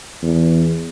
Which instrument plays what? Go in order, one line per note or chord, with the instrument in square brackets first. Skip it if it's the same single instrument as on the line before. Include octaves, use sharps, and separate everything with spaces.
[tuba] E2